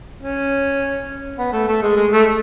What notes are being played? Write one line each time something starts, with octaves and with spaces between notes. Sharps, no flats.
C#4
B3
A3
A3
G#3
G#3
A3